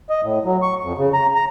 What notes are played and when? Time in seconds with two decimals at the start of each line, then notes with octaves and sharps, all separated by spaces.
0.10 D#5
0.23 A2
0.45 F#3
0.62 C#6
0.83 F2
0.98 C#3
1.14 A#5
1.35 A#5